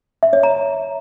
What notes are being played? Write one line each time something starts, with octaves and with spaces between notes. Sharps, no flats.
E5
C#5
A#5